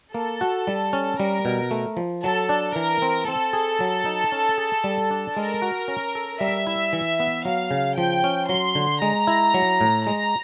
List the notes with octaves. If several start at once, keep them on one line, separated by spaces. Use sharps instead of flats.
A#3 A4
F#4
G3
C#4
G3 A#4
B2
A3
F3
F#3 A4
D4
E3 A#4
C4
C4 A4
G#4
F#3
D#4
C#4
G#4
G3
D4
G#3 A#4
F#4
C#4
A4
G3 E5
E4
E3
B3
F#3 F5
C#3
F3 G5
C#4
F#3 C6
D3
G#3 A#5
E4
F#3
A2
G#3 A#5